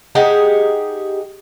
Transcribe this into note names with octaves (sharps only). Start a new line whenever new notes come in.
D#4 G4 G#4 F#5